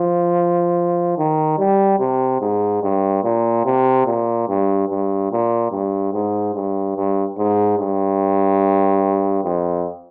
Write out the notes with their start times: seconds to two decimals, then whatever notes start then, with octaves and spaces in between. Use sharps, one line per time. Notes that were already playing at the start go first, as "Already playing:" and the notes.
Already playing: F3
1.18 D#3
1.58 G3
1.99 C3
2.41 G#2
2.83 G2
3.24 A#2
3.65 C3
4.06 A#2
4.48 G2
4.89 G2
5.31 A#2
5.72 G2
6.13 G#2
6.54 G2
6.96 G2
7.38 G#2
7.79 G2
9.44 F2